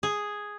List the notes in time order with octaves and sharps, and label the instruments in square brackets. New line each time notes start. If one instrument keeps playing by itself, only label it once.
[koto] G#4